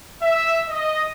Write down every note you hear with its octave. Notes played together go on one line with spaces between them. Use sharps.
E5
D#5